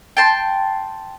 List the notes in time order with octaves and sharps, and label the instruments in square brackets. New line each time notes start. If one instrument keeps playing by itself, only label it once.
[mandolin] G5 A5 C6